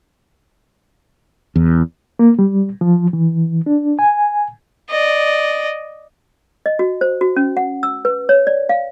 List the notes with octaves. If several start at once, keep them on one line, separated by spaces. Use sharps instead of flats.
E2
A#3
G3
F3
E3
D4
G#5
D5 D#5
D#5
F#4
C5
F#4
C#4
F#5
E6
B4
C#5
D5
F5